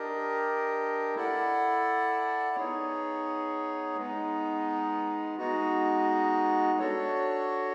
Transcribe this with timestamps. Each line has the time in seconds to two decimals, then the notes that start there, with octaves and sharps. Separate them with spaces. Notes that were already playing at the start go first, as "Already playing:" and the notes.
Already playing: D4 G4 A#4 D#5
1.15 E4 A4 D5 F#5
2.56 B3 D#4 G#4 C#5
3.97 G#3 B3 D#4
5.38 G#3 B3 D#4 F#4
6.79 D4 F#4 A4 C#5